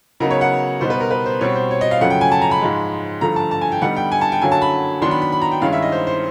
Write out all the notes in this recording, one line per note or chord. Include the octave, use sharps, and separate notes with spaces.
C#3 F#3 B3 D#4 A#4
C#5
F#5
B2 G3 B3 D#4 C5
B4
A#4
B4
C5
B2 G3 C4 C#5
C5
C#5
D#5
F5
F#2 C#3 F3 A3 F#5
G5
G#5
A5
A#5
B5
G#2 F3 G#3
G2 D3 F3 A3 A#5
A5
A5
G#5
G5
G2 D3 G3 B3 D#4 F#5
G5
G#5
A5
G5
F#2 D3 F#3 A#3 G#5
A5
B5
D#3 F#3 B3 D4 C6
B5
B5
B5
A#5
G5
G2 D#3 G#3 C#4 E4 F5
E5
D#5
C5
C5